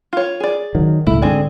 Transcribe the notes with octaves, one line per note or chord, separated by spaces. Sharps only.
F4 C#5
G#4 D5
D#3 F#3
C#2 A2 A3 E4
G#2 D3 C4 G#4 D5